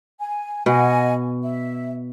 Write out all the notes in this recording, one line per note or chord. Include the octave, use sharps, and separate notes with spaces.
G#5
B2 D#5 F#5 G#5
E5